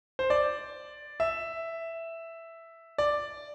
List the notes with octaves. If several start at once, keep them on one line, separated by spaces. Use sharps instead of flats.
C5
D5
E5
D5